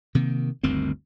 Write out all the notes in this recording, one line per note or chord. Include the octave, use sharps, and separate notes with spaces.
C3 D#3 A#3
G1 D2 D#3 C4